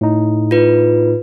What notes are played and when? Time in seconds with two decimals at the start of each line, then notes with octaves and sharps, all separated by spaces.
0.01 A2 D#4
0.51 F4 B4